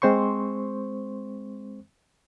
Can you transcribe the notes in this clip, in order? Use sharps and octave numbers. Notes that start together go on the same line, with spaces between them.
G#3 C4 C5 C6 C#6